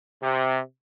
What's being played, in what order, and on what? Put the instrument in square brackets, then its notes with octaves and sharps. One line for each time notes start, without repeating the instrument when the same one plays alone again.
[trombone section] C3